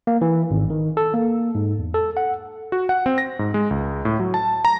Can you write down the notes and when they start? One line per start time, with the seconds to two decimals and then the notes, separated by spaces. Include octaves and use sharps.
0.07 A#3
0.21 E3
0.51 G#1
0.70 D#3
0.97 A4
1.14 A#3
1.55 G#2
1.79 E2
1.94 A4
2.17 F#5
2.72 F#4
2.89 F#5
3.06 C4
3.18 A#6
3.39 G#2
3.54 G#3
3.71 C#2
4.05 A2
4.20 F#3
4.34 A5
4.65 A#5